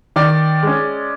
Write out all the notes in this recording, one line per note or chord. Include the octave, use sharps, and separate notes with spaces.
D#3 D5
G#3 C#4